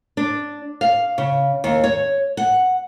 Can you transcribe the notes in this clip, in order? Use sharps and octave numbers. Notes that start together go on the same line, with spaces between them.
D4
F5
C#3
D#2
C#5
F#5